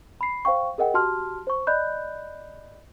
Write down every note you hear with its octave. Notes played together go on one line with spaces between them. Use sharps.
B5 C7
C5 F5 G5 C#6
G#4 A#4 D#5 F#5 G5
F#4 G4 A5 C6 F6
C5 C#6
D5 D#5 B5 F#6 G6